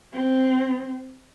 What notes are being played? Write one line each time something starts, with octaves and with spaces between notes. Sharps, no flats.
C4